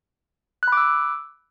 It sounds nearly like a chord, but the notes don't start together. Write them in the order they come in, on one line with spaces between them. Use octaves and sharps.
F#6 B5 D6 E6